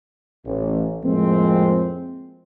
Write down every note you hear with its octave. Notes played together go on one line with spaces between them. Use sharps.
A1
F2 A2 F3 G#3 A#3 C4